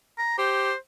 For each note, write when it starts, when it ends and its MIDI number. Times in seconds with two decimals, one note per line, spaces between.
0.18 0.36 82
0.38 0.72 67
0.38 0.76 72